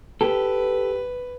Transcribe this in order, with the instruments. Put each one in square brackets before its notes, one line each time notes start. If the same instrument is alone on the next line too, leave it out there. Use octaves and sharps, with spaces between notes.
[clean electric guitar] G4 A4 [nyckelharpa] B4